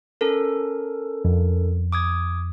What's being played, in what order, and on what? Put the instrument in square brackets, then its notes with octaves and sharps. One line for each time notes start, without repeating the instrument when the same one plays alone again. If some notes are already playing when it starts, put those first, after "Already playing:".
[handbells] C#4 A4 A#4
[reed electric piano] F2
[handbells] D6 D#6 G#6